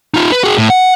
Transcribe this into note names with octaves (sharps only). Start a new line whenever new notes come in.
D#4 F4
B4
F#4 G#4
A2
F#5